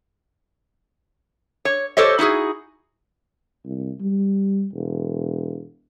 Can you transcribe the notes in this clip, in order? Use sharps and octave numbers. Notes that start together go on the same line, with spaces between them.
C#5
G4 A4 C5 C#5 D#5
D#4 E4 F#4 G#4
C2
G3
E1